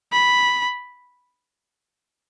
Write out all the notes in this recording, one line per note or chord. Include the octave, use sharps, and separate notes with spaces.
B5